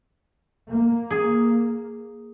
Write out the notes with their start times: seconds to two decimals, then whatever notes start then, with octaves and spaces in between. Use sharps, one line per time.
0.69 A#3
1.11 G#4